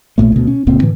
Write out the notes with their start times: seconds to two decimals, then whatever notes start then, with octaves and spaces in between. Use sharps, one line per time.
0.18 B1 A#2 A3
0.32 D2 B2
0.47 C#4
0.67 D1 C#2 A#2 C4
0.82 A2 D3 E3